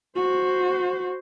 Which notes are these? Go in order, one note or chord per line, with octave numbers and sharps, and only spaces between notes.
F#4 C5